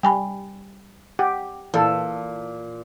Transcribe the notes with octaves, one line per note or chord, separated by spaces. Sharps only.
G3 G5 G#5 B5
G4 F#5
A#2 E3 A4